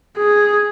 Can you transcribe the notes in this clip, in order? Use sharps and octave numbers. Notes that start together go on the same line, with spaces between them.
G#4